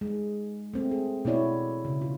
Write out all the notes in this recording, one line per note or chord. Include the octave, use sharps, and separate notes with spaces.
G#3
A3 C4
G#4
B2 A3 B3 E4 C#5 D5
C#3
F4